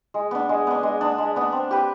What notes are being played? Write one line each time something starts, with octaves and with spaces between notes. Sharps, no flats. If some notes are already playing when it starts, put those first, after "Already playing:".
G#3
B3 D4
G#3
B3 D4
G#3
B3 D4
G#3
B3 D4
C4
G4 B4